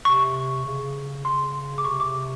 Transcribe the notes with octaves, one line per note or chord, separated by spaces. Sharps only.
C3 C#6
C#3
C#3 C6
D6
C3 C#6
D6